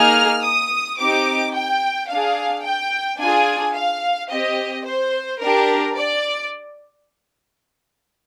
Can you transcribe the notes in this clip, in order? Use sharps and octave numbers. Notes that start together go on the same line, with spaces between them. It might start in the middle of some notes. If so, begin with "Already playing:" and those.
Already playing: A#3 D#4 G#4 F6
D#6
C4 D#4 G4 D6
G5
D4 G#4 F5
G5
D4 F4 G#4 G#5
F5
C4 G4 D#5
C5
D4 G4 A#4
D5